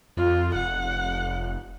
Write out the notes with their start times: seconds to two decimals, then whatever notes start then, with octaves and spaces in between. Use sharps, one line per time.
0.17 F2 F4
0.55 F1 F#5